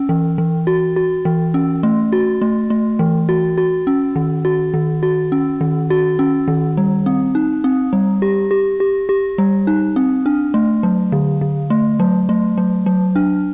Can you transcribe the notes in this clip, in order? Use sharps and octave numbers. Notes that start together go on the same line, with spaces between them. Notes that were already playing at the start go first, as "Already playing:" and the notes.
Already playing: C#4
E3
E3
F#4
F#4
E3
C#4
A3
F#4
A3
A3
E3
F#4
F#4
C#4
D#3
F#4
D#3
F#4
C#4
D#3
F#4
C#4
D#3
G3
C4
D#4
C4
G3
G4
G4
G4
G4
G3
D#4
C4
D4
A3
F#3
D3
D3
A3
F#3
A3
F#3
F#3
D4